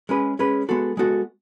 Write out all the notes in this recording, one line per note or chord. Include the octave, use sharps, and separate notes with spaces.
G#3 C#4 G#4 B4
G#3 C#4 G#4 B4
G#3 B3 F#4 A4
G#3 B3 F#4 A4